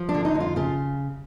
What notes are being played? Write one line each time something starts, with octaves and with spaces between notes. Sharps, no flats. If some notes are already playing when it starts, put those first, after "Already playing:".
Already playing: F3
D4
D3
D#4
F2
F4
C#3 F4